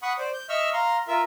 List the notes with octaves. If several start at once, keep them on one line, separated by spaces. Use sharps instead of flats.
F#5 B5 C#6 D#6
C5 D5
G6
D#5 E5 C#6 E6 F6
F5 A#5 C6
F4 A#4 E5